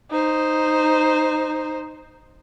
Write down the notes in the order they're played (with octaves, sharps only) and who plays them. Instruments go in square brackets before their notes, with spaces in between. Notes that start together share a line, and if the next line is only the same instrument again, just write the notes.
[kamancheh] D#4 C5